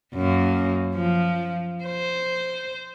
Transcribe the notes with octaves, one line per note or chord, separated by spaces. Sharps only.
F#2 A#3
F3
C5